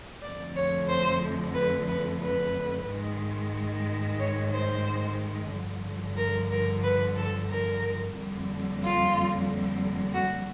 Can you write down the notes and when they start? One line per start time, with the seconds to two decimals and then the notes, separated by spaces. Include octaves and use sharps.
0.22 F2 D3 F3 A3 D5
0.56 C#5
0.88 C5
1.54 B4
1.87 B4
2.21 B4
2.86 G#2 D#3 G#3
4.19 C#5
4.51 C5
5.51 G2 D3 F3
6.16 A#4
6.51 A#4
6.82 B4
7.15 A4
7.49 A#4
8.14 F2 D3 G3 A#3
8.82 F4
10.13 F#4